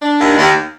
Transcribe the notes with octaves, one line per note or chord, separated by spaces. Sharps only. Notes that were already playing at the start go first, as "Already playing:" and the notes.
D4
D#2
D#2